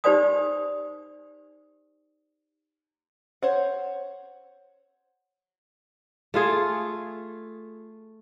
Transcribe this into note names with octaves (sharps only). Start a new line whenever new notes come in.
D#4 G4 C5 D5 G#5 D#6
C5 C#5 F#5
A3 F4 G#4 A4